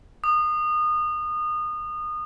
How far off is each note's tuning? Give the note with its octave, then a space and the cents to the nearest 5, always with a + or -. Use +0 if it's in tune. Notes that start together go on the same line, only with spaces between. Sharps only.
D#6 -25